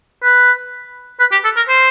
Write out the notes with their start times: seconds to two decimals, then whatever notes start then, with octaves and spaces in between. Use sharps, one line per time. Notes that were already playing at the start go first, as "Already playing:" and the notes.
0.23 B4
1.20 B4
1.31 G4
1.44 A4
1.56 A#4
1.69 C5